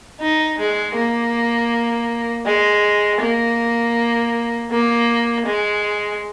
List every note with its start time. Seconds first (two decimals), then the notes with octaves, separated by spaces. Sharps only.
0.21 D#4
0.58 G#3
0.96 A#3
2.46 G#3
3.21 A#3
4.70 A#3
5.46 G#3